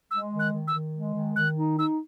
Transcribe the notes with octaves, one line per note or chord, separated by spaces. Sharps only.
G#3 E6
D#3
F#6
D#3
E6
D#3
G#3
D#3
D#3 F#6
D#4
D#4 E6